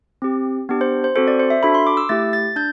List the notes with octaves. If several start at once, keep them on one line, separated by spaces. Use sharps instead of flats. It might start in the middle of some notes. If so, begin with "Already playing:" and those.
C4 G4
B3 D4 G4
C5
C5
C4 F#4 A4 C5
D5
C5
E5
D4 F#4 A4 B5
C6
D6
E6
A3 E4 G4 A6
A6
D4 G6